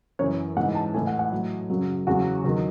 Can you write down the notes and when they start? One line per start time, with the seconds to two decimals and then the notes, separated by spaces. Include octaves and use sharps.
0.19 F#2 E3 C#5
0.57 G#2 F#5
0.60 E3
0.75 A5
0.94 A2 E3 G#5
1.07 F#5
1.19 F#5
1.32 A2 F#3
1.69 F#2 C#3 F#3
2.07 E2 C#3 F#3 F#4
2.44 E2 D#3 F#3